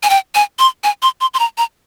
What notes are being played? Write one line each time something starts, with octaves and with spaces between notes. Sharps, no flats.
G#5
G5
G#5
C6
G#5
C6
C6
C6
A#5
A#5